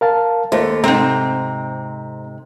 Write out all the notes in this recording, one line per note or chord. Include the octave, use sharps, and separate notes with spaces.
A#4 F5 A5
D#2 A3 C5
G#2 C3 C4 A#5